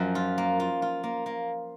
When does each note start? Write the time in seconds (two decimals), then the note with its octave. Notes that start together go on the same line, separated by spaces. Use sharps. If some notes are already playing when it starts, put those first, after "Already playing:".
Already playing: F#2 F3 C#4
0.15 F4
0.38 A#3
0.60 F4
0.82 F4
1.03 A#3
1.26 A#3